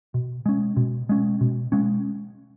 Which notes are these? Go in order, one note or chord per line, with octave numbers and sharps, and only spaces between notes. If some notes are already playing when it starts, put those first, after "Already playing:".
B2
G#3 C#4
B2
G#3 C#4
B2
G#3 C#4